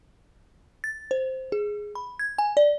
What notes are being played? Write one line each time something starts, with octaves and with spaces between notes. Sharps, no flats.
A6
C5
G#4
B5
G#6
G#5
D5